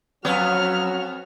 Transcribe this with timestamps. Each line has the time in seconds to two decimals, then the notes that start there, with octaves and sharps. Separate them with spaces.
0.25 F2 F#3 B3 C#4 F#4 C#5 F6